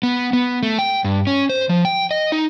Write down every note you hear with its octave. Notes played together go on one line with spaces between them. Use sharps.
B3
B3
A3
G5
G2
C#4
C5
F3
G5
D#5
D#4